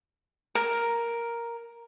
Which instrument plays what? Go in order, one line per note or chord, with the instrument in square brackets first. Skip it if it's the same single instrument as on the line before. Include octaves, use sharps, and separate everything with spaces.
[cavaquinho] A#4